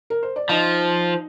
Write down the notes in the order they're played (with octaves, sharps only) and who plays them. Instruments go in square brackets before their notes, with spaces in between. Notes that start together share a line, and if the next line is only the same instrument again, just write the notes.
[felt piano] A#4
C5
D5
[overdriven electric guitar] F3 [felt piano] D#4 D#5